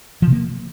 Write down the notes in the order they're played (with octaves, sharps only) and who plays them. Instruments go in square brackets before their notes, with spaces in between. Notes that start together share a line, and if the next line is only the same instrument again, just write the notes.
[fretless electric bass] F3
C3
A#3